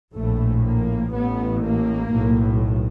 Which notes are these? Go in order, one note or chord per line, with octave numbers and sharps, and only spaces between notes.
A#1 A2 A3
A#3
A1 A2 B3
A#3
B1 A2